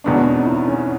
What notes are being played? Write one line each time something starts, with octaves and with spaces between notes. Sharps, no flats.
E2 B2 G#3 B3 D4
C#4
C4
D#4
E4
C#4